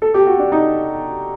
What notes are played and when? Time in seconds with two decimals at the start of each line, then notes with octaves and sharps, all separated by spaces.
0.02 A4
0.14 G4
0.27 F#4
0.39 D4
0.52 D#4